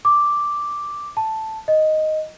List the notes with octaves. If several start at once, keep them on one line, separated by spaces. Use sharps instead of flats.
D6
A5
D#5